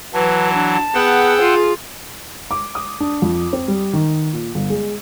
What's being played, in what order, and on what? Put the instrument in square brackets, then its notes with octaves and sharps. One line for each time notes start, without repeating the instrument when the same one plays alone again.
[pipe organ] E3 F#3 [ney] B4 [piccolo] A5
[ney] D4
[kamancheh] B3 [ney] G#4 [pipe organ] F#5 G5 E6
[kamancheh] F4
[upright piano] D6
D#6
D4
F2
C4
G3
D#3
A#2
G1
G#3